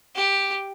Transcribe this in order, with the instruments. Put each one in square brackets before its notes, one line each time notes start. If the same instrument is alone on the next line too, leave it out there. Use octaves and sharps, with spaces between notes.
[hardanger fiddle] G4